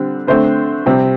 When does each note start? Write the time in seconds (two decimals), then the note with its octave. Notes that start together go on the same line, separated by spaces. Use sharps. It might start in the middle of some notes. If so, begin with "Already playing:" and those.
Already playing: D3 G3 C4
0.27 D3 A3 C4 C5
0.86 C3 G3 C4